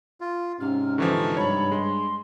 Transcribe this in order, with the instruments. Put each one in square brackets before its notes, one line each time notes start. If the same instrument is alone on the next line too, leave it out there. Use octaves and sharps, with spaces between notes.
[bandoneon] F4
[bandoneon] G#2 C3 [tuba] C#4 [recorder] F6
[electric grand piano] D3 E3 F3 [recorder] C#6
[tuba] G2 [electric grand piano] C#5 A5 [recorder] B5
[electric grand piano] G#3 [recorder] C6